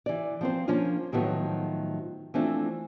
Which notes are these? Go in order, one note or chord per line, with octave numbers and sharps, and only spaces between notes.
E3 D5
F3 C4 C5
F3 A#3 C#4 D4 F4
A2 D#3 F3 F#3 A3 B3
E3 F3 A3 C4 D4 F4